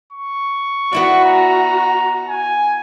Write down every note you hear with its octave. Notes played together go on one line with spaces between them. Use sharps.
C#6
B3 E4 F#4 D5
A#5
G#5